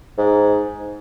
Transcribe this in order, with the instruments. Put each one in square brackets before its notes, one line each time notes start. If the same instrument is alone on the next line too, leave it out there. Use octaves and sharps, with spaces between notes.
[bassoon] G#2